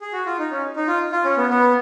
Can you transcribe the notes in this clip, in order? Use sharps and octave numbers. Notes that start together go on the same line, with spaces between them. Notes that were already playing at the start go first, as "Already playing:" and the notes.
G#4
F#4
F4
D#4
C#4
D#4
F4
F4
C#4
B3
B3